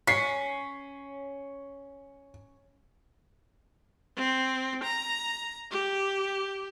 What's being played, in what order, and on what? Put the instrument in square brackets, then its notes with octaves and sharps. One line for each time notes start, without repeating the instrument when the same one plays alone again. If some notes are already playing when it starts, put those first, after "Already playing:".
[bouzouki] C#4 [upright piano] B6 C7
[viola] C4
A#5
G4